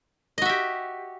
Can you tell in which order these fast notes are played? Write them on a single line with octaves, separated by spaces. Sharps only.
D#5 F#4 E5 G4